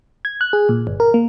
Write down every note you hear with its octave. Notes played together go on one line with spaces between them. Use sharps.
G#6
F#6
G#4
A#2
G1
A#4
A#3